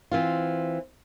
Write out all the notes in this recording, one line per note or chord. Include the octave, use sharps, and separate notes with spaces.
E3 C4 F4